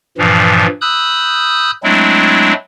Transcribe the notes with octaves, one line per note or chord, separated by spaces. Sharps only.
G2 A#2 E3 F3
B5 D#6 E6 F#6 G6
F#3 G#3 A3 C4 D4 E4